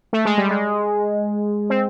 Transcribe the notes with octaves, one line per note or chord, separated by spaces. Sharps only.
A3
G#3
G3
G#3
C4